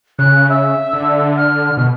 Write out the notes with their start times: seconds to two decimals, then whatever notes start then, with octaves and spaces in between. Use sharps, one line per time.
0.19 C#3 F#6
0.49 E5
0.93 D3
1.37 F6
1.77 B2